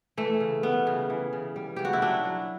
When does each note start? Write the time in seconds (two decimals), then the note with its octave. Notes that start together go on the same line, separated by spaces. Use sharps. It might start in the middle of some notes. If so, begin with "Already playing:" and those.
0.17 E3 A3
0.41 C#3
0.63 G3 B3
0.87 C#3
1.10 E3
1.33 C#3
1.56 G3
1.76 C#3 G4
1.85 F#4
1.93 E4
2.02 F#3 D4
2.25 F#3